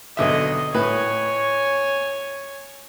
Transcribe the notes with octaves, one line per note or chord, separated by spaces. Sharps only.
B1 D3 D#5 E5
A2 B4 C#5 G#5